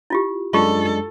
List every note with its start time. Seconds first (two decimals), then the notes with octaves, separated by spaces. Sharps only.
0.10 E4 F4 G4
0.53 F#2 G#3 D4 F4 A4 C#6